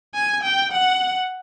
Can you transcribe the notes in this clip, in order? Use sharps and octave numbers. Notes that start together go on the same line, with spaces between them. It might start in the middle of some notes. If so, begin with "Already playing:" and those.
G#5
G5
F#5